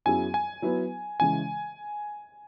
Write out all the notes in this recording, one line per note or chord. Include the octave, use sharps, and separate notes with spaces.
F#2 F#3 B3 E4 G#4 G#5
G#5
F#3 B3 E4 B4
C#3 E3 G#3 G#5